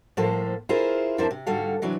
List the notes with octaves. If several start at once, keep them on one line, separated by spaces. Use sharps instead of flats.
A2 F3 A#3 A4 C5
E4 F4 G#4 A#4 C5
F2 F3 D4 E4 A#4 C5
C3
G#2 D3 G3 F#4 A4 F5
C3 E3 F#3 D4